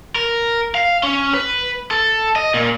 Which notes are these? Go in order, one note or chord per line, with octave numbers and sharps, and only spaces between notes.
A#4
F5
C#4
B4
A4
D#5
A#2